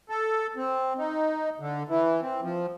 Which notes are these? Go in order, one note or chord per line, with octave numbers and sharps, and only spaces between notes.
A4
C4
D#4
D3
E3
C4
F3